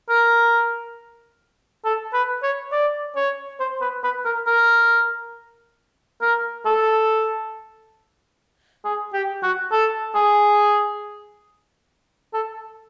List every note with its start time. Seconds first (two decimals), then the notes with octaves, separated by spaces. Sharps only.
0.09 A#4
1.85 A4
2.14 B4
2.43 C#5
2.72 D5
3.16 C#5
3.60 C5
3.81 B4
4.04 B4
4.25 A#4
4.47 A#4
6.21 A#4
6.66 A4
8.85 G#4
9.13 G4
9.43 F#4
9.72 A4
10.15 G#4
12.34 A4